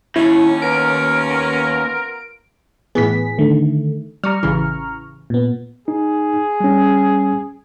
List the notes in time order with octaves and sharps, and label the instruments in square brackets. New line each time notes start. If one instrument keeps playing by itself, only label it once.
[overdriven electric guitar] D#2 [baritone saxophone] C#4 [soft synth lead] E4
[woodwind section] B3 F4 A#4 [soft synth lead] D7
[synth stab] A2 E3 B3 [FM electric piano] G#4 B6
[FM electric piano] D3 D#3 A3
[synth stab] G3 [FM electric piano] A#5 C#6 F6
[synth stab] A1 C#3 E3
[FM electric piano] A#2 B3
[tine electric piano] D#4 [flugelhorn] G#4
[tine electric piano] G3 C#4